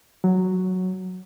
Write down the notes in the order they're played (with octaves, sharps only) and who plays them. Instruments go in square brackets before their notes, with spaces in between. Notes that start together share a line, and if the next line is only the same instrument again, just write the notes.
[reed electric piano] F#3